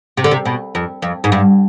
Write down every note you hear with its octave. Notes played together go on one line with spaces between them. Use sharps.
C3
D3
C3
B2
F2
F2
G#2
G2